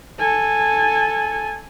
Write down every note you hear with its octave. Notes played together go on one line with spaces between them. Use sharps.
A4 G#5